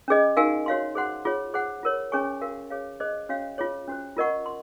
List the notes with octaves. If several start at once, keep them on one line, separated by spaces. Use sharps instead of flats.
C#4 G#4 D#5
D#4 F#4 A#4 F5 G#5
F#4 C#5 F5 C6
G#4 C5 F#5 C6
F4 G#4 C#5
G#4 C5 F#5
F4 A#4 C#5
C#4 G#4 C#5 G#5 C#6
F#4 A#4 F5
G#4 C#5 F5
G#4 C5 D#5
C#4 F#4 C#5 F5
F4 G#4 C#5
C#4 F#4 C5
F4 A#4 D#5 F#5 C#6
C6